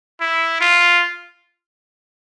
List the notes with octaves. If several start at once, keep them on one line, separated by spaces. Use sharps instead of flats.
E4
F4